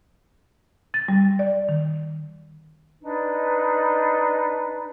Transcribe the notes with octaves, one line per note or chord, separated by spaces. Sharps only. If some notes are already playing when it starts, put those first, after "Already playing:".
A6
G3
D5
D#3
D4 D#4 B4